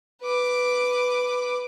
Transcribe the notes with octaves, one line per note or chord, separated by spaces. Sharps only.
B4 D6